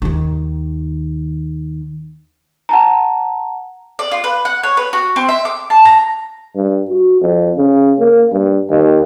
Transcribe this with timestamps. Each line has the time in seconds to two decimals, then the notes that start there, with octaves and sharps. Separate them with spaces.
0.02 D#2 D#3
2.69 F#5 A5 A#5
3.99 D5
4.11 F4
4.24 B4
4.45 F#5
4.63 C#5
4.77 B4
4.93 F#4
5.16 C4
5.29 E5
5.45 D6
5.70 A5
5.85 A#5
6.55 G2
6.89 F#4
7.21 F2
7.57 C#3
7.99 A#3
8.32 G2
8.70 D#2